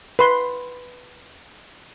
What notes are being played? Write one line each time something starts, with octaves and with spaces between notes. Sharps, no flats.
B4 C6